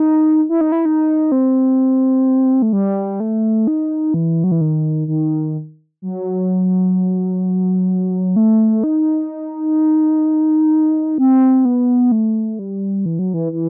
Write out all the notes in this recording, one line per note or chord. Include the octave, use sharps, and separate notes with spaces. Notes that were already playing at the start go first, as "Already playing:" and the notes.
Already playing: D#4
E4
D#4
E4
D#4
C4
A3
G3
A3
D#4
E3
F#3
E3
D#3
D#3
F#3
A3
D#4
C4
B3
A3
G3
E3
F#3
E3
E3